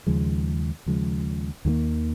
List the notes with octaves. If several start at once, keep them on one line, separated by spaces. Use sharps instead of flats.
D#2 C#3 F3 G#3
D#2 C#3 F3 G#3
D#2 D#3 F#3 A#3